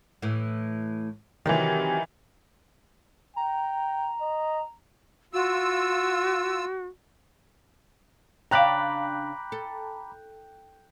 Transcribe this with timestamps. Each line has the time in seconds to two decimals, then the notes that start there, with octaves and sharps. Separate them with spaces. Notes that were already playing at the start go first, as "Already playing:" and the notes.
0.22 A2 E3
1.46 C3 D#3 E3 F#3
3.36 G5 A#5
4.21 D#5
5.33 F4 F#4 E6
8.51 C#3 D4 F5 G5 A#5 B5 D6 F#6
9.52 A4